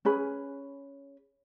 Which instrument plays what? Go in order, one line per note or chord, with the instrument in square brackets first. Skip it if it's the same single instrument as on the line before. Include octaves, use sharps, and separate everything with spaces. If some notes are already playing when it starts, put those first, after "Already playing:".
[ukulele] C#4 G#4 B4 B5